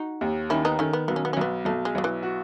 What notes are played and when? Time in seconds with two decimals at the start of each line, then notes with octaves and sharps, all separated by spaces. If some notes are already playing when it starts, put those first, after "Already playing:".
Already playing: D#4 F#4
0.21 D#2
0.50 D#3 C#4 E4
0.65 B3 D#4
0.79 D#3 A3 C#4
0.93 B3
1.08 B1 B3
1.16 C#4
1.25 B3
1.33 C#4
1.37 B1 B3
1.65 B1 A3
1.85 G#3
1.95 B1 F#3
2.04 E3
2.23 F#4